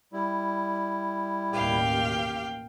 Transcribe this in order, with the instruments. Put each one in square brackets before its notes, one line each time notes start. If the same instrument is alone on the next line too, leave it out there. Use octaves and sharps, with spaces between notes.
[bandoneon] G3 E4
[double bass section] A1 D#2 B2 [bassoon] G4 [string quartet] F5 G5